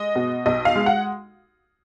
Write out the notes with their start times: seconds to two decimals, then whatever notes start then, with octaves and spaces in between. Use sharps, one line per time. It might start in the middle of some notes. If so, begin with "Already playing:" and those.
Already playing: G#3 D#5
0.16 B2
0.46 B1 D#5
0.65 F5
0.76 G#3
0.86 F#5